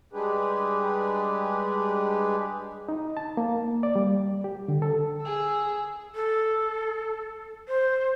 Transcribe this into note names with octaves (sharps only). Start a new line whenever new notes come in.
G3 G#3 D4 G4 G#4 B4
D#4
A5
A#3
D5
G3
G4
D3
A4
G#4 E6
A4
C5